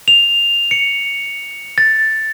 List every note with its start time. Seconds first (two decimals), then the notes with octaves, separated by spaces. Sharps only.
0.08 F7
0.71 C#7
1.78 A6